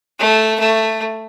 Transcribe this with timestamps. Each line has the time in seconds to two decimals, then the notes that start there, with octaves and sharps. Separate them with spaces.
0.19 A3
0.60 A3